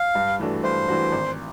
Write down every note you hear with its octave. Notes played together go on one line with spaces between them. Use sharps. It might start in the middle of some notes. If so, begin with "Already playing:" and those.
Already playing: F5
G2
E3 A3 D4 F#4
G2 C5
E3 A3 D4 F#4
G#1